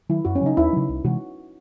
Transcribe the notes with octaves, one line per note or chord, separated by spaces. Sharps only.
D#3 F#3 E4
F#2 F#4
C#4
C#3 F#3 D#4
D#2 E4
C#3 F#3
C2
C3 E3 G#3 F#4